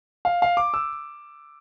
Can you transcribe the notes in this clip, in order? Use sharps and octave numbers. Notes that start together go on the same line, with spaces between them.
F5
F5
D6
E6